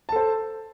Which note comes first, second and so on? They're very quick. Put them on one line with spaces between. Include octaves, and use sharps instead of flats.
A5 A4 C5